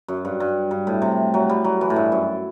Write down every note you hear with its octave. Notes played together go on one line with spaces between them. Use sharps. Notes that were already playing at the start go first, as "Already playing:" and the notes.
F#2
G2
G2
G2
A2
C3
F#3
G3
F#3
E3
A2
G2
F#2